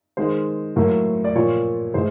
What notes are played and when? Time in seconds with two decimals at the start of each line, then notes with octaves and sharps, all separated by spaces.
0.17 D#3 G#3 C5
0.76 A2 F#3 A#3
1.24 D5
1.35 A#2 F3 A#3 C#5
1.94 A2 E3 G#3 C5